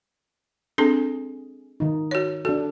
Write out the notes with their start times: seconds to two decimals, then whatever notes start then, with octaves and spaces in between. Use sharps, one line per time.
0.78 C4 D4 G#4 A4
1.80 D#3 D#4
2.11 F#4 C#5
2.45 D4 F#4 A4